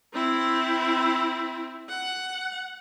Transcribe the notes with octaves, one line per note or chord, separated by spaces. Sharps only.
C4 E4
F#5